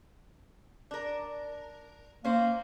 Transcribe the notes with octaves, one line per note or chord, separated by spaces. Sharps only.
D4 A#4
A#3 C#4 C5